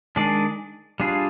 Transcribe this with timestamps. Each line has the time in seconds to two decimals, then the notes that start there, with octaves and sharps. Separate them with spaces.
0.16 D#3 G#3 D4 G#4 D5
1.00 G3 D4 F4 G#4